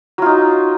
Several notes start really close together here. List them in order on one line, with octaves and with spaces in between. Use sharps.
F#3 F4 D#4